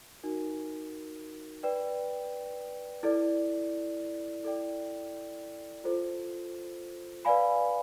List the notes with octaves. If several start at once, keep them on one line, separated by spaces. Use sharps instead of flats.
D#4 F#4 A#4
B4 D5 G5
E4 A4 D5
E4 A4 D5 G5
F4 A4 C5
B4 D5 F5 G#5 B5